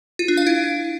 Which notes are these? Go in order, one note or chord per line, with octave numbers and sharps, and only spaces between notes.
F4
D4
F5
E4